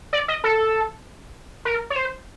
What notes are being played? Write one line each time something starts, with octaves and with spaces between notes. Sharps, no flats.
D5
D#5
A4
A#4
C#5
C5